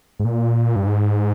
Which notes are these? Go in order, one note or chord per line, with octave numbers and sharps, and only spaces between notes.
G#2
A#2
G2
G#2